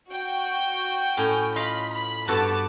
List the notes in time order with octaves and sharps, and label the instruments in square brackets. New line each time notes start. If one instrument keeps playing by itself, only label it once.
[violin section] F#4 G5
[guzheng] A2 C#4 G#5
[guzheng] F4 D#5 F5 [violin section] B5
[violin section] B5
[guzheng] G2 F#4 A4 [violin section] B3 A5 D6